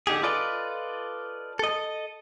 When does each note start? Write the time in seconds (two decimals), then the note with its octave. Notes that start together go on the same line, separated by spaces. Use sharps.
0.07 D3 D#4 G4 G#4
0.23 F4 A4 B4 D5 D#5
1.59 A4 D#5